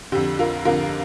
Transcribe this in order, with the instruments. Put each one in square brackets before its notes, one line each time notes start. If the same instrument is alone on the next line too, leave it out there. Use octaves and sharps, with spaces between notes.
[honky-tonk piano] F2 D3 G4
F4 A#4
F2 D3 F4 A#4